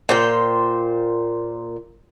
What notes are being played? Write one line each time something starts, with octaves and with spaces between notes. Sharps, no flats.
A#2 C5 G5